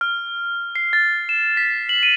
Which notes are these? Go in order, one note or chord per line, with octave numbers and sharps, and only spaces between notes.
F6
C7
A6
E7
B6
F#7
D#7